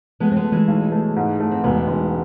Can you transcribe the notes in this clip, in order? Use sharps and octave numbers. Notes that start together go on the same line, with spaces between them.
G#3 A3 B3
C4
G#3 B3
A3
E3 G#3
B1
A3
G#2
A3
C4
E1 G#3 B3
E1